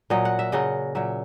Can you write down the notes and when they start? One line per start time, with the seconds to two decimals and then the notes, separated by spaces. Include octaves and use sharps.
0.10 A#2 F#3 D#5
0.25 F#5
0.39 E5
0.52 C#3 F#3 D#5
0.95 A#2 F#3 E5